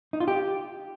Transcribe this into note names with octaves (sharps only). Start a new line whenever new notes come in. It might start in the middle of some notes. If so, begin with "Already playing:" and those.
D#4
F4
G4